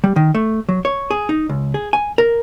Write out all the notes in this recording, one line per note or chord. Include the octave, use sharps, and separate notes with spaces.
G3
D#3
A3
F#3
C#5
G#4
D#4
C#2
G#4
G#5
A#4